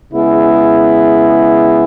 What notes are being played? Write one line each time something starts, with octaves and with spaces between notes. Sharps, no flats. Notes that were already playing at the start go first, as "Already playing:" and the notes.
C#3 G#3 B3 E4 G#4